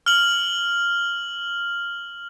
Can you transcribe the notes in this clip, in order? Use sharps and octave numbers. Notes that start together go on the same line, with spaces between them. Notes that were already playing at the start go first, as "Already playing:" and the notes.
F6 F#7